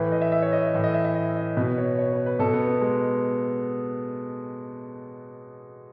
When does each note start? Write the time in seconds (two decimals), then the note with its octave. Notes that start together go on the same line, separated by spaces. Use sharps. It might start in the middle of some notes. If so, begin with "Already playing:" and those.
Already playing: A2 E3 B4
0.12 D#5
0.21 E5
0.32 E5
0.42 C#5
0.52 D#5
0.63 E5
0.74 A2 E3 E5
0.84 D#5
0.94 E5
1.05 E5
1.15 D#5
1.37 D#5
1.57 B2 B4
1.78 C#5
1.98 C#5
2.12 B4
2.26 B4
2.39 B2 A4
2.54 B3
2.67 B3
2.81 G#3